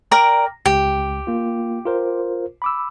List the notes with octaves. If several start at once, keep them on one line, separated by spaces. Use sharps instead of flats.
A#4 D5 G5 A#5 F6
C#2 G4
A#3 F4
F4 A#4 C5
B5 D6 E6